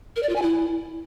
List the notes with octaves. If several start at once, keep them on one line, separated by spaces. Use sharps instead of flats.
A#4
D5
F4
G#5
E4